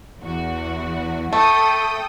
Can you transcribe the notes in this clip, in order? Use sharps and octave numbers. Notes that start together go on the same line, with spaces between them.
E2 F#4
A3 A4 G5 D#6